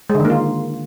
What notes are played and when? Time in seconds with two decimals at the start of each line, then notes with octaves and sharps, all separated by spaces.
0.10 G#3
0.15 D3
0.20 D#3
0.25 A#3
0.30 F4